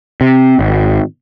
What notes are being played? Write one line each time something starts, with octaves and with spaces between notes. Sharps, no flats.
C3
G#1